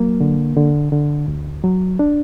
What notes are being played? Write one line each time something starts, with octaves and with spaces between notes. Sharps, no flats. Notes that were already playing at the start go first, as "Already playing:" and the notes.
Already playing: F#3 A#3
D3
D3
D3
D2
F#3
D4